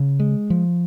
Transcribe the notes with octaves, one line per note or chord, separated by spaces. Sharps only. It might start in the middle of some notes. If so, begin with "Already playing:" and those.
Already playing: C#3
G#3
F3